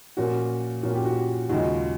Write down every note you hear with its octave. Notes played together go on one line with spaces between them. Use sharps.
A#2 F3 A#3 C#4 F#4
A#2 F3 A#3 C#4 F#4
G4
F#4
D#2 C#3 F3 G#3 F#4